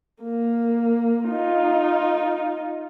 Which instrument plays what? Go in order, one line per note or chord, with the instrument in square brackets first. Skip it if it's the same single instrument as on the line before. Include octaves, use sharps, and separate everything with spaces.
[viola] A#3
D#4 F4